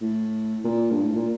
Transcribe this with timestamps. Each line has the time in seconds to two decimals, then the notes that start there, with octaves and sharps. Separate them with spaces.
0.02 A2
0.64 A#2
0.91 G2
1.04 A2
1.16 A#2